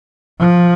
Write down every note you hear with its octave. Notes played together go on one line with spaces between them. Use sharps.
F3